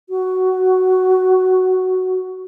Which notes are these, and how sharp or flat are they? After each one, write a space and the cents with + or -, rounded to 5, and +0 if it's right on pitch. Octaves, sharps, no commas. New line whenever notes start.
F#4 +5